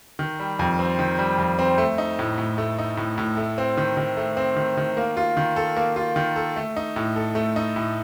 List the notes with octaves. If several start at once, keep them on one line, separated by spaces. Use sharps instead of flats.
D#3
G3
F2
C4
D#3
G3
F2
C4
A3
D#4
A2
A2
A3
D#4
A2
A2
A3
C4
D#3
D#3
A3
C4
D#3
D#3
A#3
F4
D#3
A4
A#3
F4
D#3
A4
A3
D#4
A2
A4
A3
D#4
A2